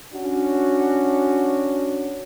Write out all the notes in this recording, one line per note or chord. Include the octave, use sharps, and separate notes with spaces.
C#4 D4 F#4